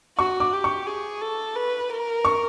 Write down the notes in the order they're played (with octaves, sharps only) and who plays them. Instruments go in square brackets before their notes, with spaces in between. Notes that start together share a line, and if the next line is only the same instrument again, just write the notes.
[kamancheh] F#4 [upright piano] C#6
[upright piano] D6
[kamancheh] G4
[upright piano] C#6
[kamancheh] G#4
A4
B4
A#4
[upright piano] C#6